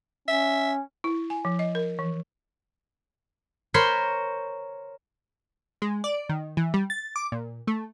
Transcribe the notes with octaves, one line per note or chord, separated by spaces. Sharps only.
C#4 E5
E4
G#5
F3
D#5
A#4
E3
A#4 C5 C#5 B5 C6
G#3
D5
D#3
E3
G3
A6
D6
A#2
A3